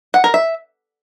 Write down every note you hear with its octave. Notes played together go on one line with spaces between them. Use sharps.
F#5
A#4
E5